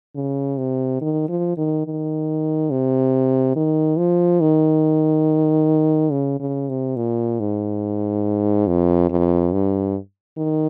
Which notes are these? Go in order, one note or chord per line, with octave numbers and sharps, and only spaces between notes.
C#3
C3
D#3
F3
D#3
D#3
C3
D#3
F3
D#3
C#3
C#3
C3
A#2
G#2
F2
F2
G2
D#3